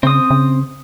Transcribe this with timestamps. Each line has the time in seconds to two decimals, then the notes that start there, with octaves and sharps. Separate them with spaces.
0.03 C#3 C4 D#6
0.30 C#3